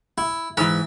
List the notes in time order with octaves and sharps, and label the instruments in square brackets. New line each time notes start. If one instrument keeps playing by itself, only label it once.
[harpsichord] E4
[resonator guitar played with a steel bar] G#2 E3 [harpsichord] E5